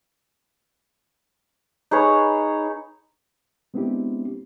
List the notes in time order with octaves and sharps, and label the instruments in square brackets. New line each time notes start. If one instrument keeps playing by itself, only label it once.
[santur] D#4 G#4 B4 C#5
[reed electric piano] G#3 B3 C4 D4 E4 G4